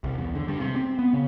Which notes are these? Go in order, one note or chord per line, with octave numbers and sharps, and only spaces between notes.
C2
E2
D3
G2
C3
C4
B3
C#3